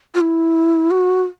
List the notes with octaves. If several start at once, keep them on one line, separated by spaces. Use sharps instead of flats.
F4
E4
F#4